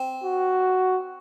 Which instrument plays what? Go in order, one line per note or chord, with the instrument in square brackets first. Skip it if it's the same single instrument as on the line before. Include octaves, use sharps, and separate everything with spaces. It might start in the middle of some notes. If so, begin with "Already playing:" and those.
Already playing: [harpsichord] C4
[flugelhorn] F#4